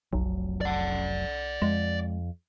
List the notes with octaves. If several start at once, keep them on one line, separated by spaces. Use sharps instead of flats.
F1 B1 F#3
D5 F#5
F2 G#3